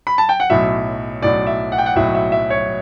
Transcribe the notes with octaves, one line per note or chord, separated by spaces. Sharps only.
B5
A5
G5
F#5
B1 A2 F#3 E5
B1 A2 F#3 D5
E5
F#5
G5
F#5
B1 A2 F#3 E5
E5
E5
C#5